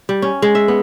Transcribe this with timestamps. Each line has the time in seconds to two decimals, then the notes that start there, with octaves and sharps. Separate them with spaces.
0.09 G3
0.22 C#4
0.42 G#3
0.55 E5
0.68 B3